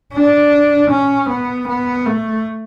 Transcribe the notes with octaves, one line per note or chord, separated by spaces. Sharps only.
D4
C#4
B3
B3
A3